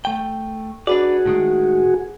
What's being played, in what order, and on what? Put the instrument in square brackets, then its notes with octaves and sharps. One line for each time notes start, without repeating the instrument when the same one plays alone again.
[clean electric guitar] A3 G5
[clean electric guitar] D4 B4 D5 [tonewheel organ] F#4 G#4
[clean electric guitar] A2 D#3 G#3